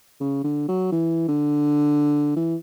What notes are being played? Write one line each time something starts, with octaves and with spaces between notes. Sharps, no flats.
C#3
D3
F#3
E3
D3
E3